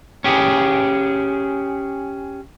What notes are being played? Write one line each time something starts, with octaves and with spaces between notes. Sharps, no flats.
C#4 G4 G#4